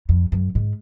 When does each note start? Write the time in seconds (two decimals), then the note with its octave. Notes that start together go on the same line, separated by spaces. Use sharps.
0.09 F2
0.32 F#2
0.55 G#2